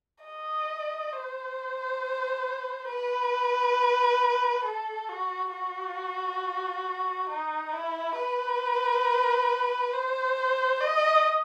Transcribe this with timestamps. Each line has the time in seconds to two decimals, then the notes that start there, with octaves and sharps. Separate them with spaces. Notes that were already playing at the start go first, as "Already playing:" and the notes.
0.25 D#5
1.13 C5
2.89 B4
4.65 A4
5.08 F#4
5.53 F#4
7.29 D#4
7.73 E4
8.17 B4
9.93 C5
10.81 D#5